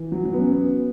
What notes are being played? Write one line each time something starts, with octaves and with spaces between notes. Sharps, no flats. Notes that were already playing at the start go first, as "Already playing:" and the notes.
Already playing: E3
F#3
F#3
B3
C#4
B3